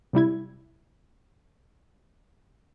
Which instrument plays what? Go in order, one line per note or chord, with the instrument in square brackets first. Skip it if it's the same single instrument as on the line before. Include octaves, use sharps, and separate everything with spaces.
[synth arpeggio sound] C3 G3 E4 G#6